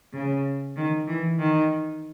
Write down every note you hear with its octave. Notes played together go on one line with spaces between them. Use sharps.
C#3
D#3
E3
D#3